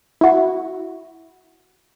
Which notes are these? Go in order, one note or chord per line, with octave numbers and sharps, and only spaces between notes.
E4 F#4